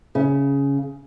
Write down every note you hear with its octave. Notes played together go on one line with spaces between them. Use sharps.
C#3